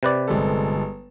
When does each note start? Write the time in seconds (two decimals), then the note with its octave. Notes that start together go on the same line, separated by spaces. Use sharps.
0.03 C3 B4 D5
0.28 G1 G#3 A4